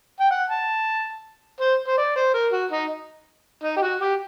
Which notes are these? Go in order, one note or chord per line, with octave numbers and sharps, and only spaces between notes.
G5
F#5
A5
C5
C5
D5
C5
A#4
F#4
D#4
D#4
G4
F#4
G4